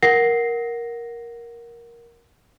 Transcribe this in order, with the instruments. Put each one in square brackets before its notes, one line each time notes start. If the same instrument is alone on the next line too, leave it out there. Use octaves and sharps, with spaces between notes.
[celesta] A#4 F#5 A#6 C7